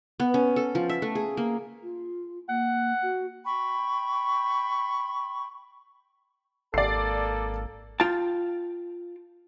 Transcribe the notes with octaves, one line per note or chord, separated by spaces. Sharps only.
B3
C#4
A4
F3
E5
A3
G#4
A#3
F4
A#3 F#5
F#4
G5 B5 C#6
G#1 A#3 A4 D5 C7
F4 G5 A5